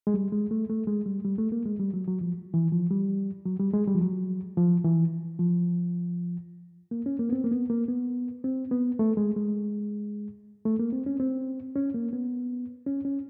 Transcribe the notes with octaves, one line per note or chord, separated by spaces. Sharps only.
G#3
G3
G#3
A3
A3
G#3
G3
G3
A3
A#3
G#3
G3
F#3
F#3
F3
E3
F3
G3
F#3
G3
G#3
G3
F3
F#3
F3
E3
F3
A#3
C#4
A#3
B3
C4
A#3
B3
A#3
B3
C4
B3
A3
G#3
G#3
A3
A#3
C4
C#4
C4
C#4
A#3
B3
C#4
C#4